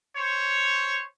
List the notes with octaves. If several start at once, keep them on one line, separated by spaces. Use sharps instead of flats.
C5 C#5